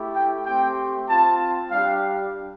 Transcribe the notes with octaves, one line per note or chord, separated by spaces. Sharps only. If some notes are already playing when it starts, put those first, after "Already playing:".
Already playing: A3 E4 G4
G5
A3 C4 G4 G5
C4 F4 A5
G3 D4 G4 F5